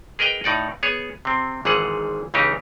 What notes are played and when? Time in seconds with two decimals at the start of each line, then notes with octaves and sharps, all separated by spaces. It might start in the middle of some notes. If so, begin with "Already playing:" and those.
0.19 G#4 A#4 B4 D#5 G5
0.44 A2 D#4 D5 F#5
0.83 B3 G#4 C#5
1.25 C3 C4
1.65 G#1 G#2 E3 F3 G#4 F#5
2.34 C#2 C#3 E3 D#4 G4